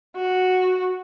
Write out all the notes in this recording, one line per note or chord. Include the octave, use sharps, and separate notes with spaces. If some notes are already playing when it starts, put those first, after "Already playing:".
F#4